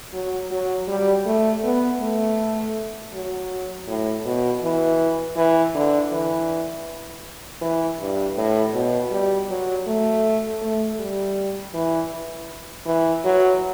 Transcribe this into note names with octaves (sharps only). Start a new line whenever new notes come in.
F#3
F#3
G3
A3
B3
A3
F#3
A2
B2
E3
E3
D3
E3
E3
G2
A2
B2
G3
F#3
A3
A3
G3
E3
E3
F#3